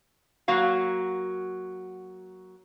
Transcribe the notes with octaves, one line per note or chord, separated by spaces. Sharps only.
F#3 A#3 F#4 F5